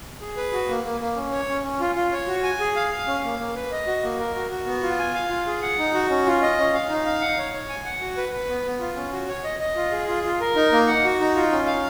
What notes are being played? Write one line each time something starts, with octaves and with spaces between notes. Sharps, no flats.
G#4
B4
F#4
A#3
A#3
A#3
C#4
C#5
C#4
C#4
F4
F4
C#5
F#4
G#5
G#4
F5
F5
C#4
A#3
A#3
B4
D#5
F#4
A#3
A#4
F#4
F#4
B3
F4
G#5
F5
F4
G#4
F#5
D#4
F#4
C#4
F4
D#5
C#4
F5
D#4
F5
F#5
C#5
C#5
G#5
F#5
F#4
B4
B4
B3
B3
F4
C#4
F#4
C#5
D#5
D#5
F4
G#4
F4
F4
A#4
D#4
A#3
F#5
F#4
D#4
F4
C#4
F5